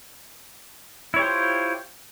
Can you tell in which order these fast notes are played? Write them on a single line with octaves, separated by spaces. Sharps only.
E4 C#5 G4 C5 F4